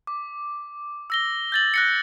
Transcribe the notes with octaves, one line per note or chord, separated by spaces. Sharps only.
D6
E6 A#6 G7
G6 A6 F#7
F#6 A#6 C#7